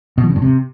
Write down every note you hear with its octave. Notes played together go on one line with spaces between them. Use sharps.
B2
F3
C#3
G2
C3